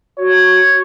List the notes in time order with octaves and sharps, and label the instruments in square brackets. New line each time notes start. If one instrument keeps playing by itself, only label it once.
[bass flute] F#4 [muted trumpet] C#5